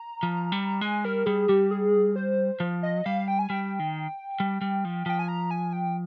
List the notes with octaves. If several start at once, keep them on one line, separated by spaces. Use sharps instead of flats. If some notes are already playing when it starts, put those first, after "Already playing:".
Already playing: A#5
F3
G3
G#3 G#5
G3 A#4
G3 G#4
G3 G4
G#4
C5
F3
D#5
G3 F5
G5
G#5
G3 G5
D#3
G3
G3
F3
F3 G5
G#5
A#5
G#5
G5